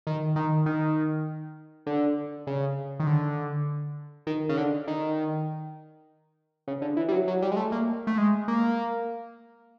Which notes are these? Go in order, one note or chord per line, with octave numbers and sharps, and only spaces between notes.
D#3
D#3
D#3
D3
C#3
D#3
D3
D#3
C#3
D3
D#3
C#3
D3
E3
G3
F#3
F#3
G3
G#3
A3
A#3
A3
G#3
A#3